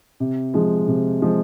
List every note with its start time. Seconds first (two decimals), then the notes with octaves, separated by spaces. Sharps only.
0.20 C3
0.54 F3 G#3
0.88 C3
1.22 F3 G#3